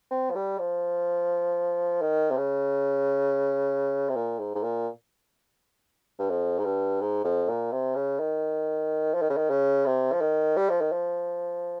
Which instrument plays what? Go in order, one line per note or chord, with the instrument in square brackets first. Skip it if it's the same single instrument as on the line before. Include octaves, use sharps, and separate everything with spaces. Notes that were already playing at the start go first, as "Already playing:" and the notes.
[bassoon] C4
F3
G3
F3
D#3
C3
C#3
C3
A#2
G#2
G#2
A#2
G2
F2
G#2
G2
G#2
F2
A#2
C3
C#3
D#3
F3
D#3
C#3
D#3
C#3
C3
F3
D#3
G3
F3
D#3
F3